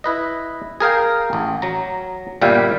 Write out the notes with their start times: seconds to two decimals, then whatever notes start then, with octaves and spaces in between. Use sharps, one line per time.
0.04 E4 B4 D#5
0.80 G#4 A#4 F5 G5
1.33 A1
1.62 F#3 A#5
2.41 G1 A#2 G3 E5 F5 G5